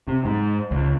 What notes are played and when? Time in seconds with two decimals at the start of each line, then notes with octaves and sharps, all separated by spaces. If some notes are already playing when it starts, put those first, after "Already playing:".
0.08 C3
0.25 G#2
0.71 C#2